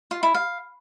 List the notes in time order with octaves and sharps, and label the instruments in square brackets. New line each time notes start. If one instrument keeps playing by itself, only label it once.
[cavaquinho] F4
E4
F5